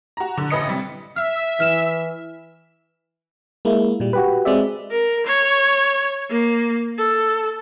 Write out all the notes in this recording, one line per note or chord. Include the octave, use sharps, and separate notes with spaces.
F#4 A#5
D3
A1 B4 D#5 C#7
C3 G3
E5 F6
E3 F6 E7
G#3 A#3 E4
A#2 G3
F#4 G4 B4
G#3 C4 D5 E5
A#4
C#5
A#3
A4